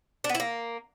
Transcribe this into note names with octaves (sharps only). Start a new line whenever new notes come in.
D4
B3
E4
A#3